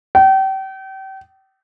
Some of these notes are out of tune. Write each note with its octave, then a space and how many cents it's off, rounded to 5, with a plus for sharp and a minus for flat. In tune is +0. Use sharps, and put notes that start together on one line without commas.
G5 -35